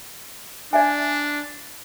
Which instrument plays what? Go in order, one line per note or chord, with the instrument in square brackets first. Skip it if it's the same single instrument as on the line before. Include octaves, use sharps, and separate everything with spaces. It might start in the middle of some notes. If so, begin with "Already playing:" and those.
[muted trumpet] D4 [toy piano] D5 E5 G#5